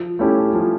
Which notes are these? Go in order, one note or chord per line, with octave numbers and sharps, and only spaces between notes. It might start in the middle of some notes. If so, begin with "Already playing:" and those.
Already playing: F3
A3 C#4 E4 G4
F3